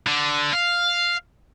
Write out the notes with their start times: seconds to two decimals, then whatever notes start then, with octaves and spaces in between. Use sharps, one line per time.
0.07 D3
0.53 F5